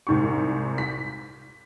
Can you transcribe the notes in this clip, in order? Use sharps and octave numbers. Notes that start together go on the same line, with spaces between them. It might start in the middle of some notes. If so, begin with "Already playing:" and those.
C2 G#2 C#6
B6